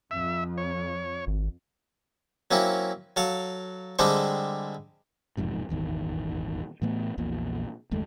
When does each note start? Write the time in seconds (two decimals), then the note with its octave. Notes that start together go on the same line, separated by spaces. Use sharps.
0.11 F2 E5
0.58 C#5
1.27 G#1
2.51 F#3 A#3 C4 C#4 E4
3.16 F#3 A4 F5
3.99 D3 G3 G#3 C4 D4 C5
5.37 E1 F2 G#2 C3
5.69 D#1 G#1 E2 D#3
6.82 A2 E3 A3 B3
7.18 A#1 E2 A#2
7.91 F#1 D#2 G#3 A3